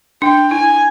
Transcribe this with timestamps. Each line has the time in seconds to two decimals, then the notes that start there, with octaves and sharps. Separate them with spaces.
0.22 D4 G5
0.51 E4 G#5